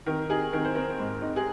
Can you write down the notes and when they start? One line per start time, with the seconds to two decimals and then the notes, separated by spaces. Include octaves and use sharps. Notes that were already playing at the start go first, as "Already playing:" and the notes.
0.06 D#3 A#4
0.30 D#4 G#4
0.53 D#3 A#4
0.65 C5
0.75 C4 A#4
0.99 G#2
1.22 D#4
1.36 G#4